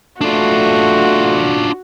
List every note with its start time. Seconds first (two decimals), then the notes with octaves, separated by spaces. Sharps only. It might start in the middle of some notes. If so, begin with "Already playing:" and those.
0.21 A3 D4 F4 F#4